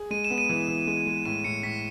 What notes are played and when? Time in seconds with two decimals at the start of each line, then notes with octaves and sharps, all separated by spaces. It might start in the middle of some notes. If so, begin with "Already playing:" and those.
Already playing: G#4
0.11 G#3 D#7
0.24 E7
0.30 B3
0.38 D#7
0.49 E3
0.68 E3
0.87 G#3
1.06 G#3
1.25 A2 D#7
1.44 A2 C#7
1.63 A2 B6